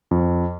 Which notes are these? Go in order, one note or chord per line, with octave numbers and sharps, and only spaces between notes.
F2